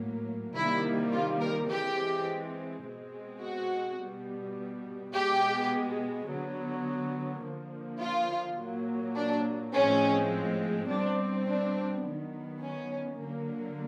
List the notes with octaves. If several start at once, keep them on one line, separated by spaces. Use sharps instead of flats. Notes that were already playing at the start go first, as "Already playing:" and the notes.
Already playing: A2 F#3 A#3
C3 D#3 G3 A#3 E4
F4
A#4
E3 G#3 C4 G4
B2 G#3 C4
F#4
B2 G3 B3
B2 G#3 B3 G4
D3 F#3 B3
D3 F3 A#3
F4
A#2 F#3 A#3
D4
A2 F3 G#3 C4 C#4
B2 G3 C4 D4
D4
D#3 F#3 B3
C#4
D3 F#3 A#3